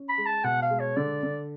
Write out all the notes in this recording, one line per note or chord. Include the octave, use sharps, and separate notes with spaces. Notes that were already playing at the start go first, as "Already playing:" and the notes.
Already playing: C#4
B5
G#3
A5
B2 F#5
F5
G#3
C#5
D3 D5
D3